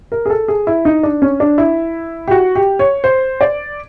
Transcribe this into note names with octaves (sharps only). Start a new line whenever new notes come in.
A#4
G#4
A4
G#4
E4
D#4
D4
C#4
D4
E4
G4
F#4
G4
C#5
C5
D5